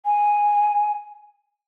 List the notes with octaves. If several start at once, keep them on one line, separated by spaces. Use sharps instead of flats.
G#5